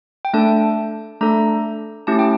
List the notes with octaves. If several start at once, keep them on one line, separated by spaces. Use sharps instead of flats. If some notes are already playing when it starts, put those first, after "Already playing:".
G5
A3 D4 A4 A5
A3 D4 A4 A#5
A3 C#4 E4 G4 A5
G5